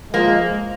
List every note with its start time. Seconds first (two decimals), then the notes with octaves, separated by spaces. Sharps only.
0.14 F3 G#3 A#3